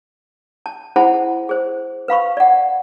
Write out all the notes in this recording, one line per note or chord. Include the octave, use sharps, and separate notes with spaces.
A5
E4 G#4 C5 F#5 A5 B5
G#4 C5
B4 F5 B5 C#6
D5 F#5